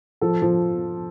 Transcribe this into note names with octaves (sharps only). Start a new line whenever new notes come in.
F3 A4
F3